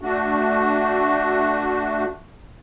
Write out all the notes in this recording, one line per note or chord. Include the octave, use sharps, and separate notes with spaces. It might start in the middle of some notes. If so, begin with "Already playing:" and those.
A3 D4 F#4